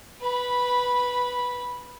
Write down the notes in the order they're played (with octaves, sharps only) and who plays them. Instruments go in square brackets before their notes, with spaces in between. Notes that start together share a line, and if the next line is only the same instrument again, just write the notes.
[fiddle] B4 B5